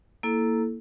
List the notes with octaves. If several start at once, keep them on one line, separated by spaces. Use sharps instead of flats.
A#3 E4 A4